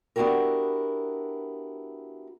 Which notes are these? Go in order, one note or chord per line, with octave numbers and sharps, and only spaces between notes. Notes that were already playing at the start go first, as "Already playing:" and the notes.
B3 D4 E4 F#4 G4 A#4